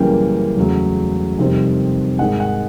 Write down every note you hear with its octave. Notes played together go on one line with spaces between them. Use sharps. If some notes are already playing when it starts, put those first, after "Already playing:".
Already playing: F#2 C#3 E3 G3 A#3 G5
E2 C#3 F#3 A3
F2 C3 D#3 G3 C4
G#2 D#3 G#3 F#5
F#5